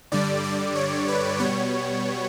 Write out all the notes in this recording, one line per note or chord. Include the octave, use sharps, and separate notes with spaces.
G2 D3 G3 D5
D5
C#5
B4
B2 G3 B3 C#5